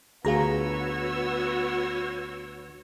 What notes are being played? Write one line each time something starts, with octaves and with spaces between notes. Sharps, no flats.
D2 B3 F4 F#4 G#4 C#5 A#5 E6